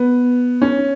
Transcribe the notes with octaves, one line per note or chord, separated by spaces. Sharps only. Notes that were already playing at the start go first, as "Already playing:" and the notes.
Already playing: B3
C#4